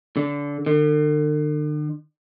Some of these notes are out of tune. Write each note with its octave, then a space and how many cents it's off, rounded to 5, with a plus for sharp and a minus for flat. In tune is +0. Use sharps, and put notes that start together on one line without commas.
D3 -25
D3 +45